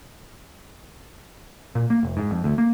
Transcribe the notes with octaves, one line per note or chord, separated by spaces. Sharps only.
A#2
A#3
F1
G#2
F2
D2
A#3